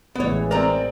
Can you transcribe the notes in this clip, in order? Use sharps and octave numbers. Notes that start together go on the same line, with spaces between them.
A1 E3 G#3 B3 C#5
C4 A#4 D5 A#5